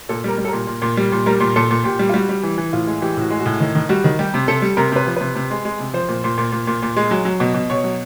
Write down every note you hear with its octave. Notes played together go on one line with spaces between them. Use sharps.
A#2 A4
G3 A#4
G3
A4
A#2 A#4
A#2
A#2
G3
A#2
G3 A#4
A#2
A#2 A4
A#2
A#2 G4
G3
F4
G3 F#4
G3
E3
E3
A2 F4
G#3
E3 G4
A2 F#4
G#3
F#4
A2
D#3
D#3
G3 F#4
D#3
G3 G4
C3
C3 A4
G3
C3 A#4
C3 B4
F3
C3 B4
C3
G#3
G#3
C3
F3 C5
A#2
A#2
A#2
A#2
A#2
A#2
G#3
F#3
F#3
B2
B2
B2 C#5
F#3